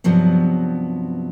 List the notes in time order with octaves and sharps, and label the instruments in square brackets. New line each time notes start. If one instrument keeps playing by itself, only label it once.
[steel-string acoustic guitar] G2 C3 F3 F#3 B3